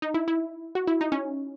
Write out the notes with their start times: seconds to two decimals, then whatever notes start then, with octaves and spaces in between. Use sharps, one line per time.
0.02 D#4
0.14 E4
0.28 E4
0.75 F#4
0.87 E4
1.01 D#4
1.12 C#4